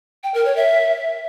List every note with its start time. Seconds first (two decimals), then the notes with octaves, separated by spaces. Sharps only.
0.23 G5
0.34 A#4
0.45 C#5
0.56 E5